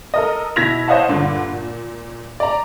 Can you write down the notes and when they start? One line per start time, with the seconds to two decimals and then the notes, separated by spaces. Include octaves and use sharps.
0.14 A4 A#4 D#5
0.56 B2 E4 G#6 A#6 B6 F7
0.88 C5 C#5 D#5 F5 F#5 A5
1.09 G2 A#2 D3
1.52 A#2
2.40 D5 A#5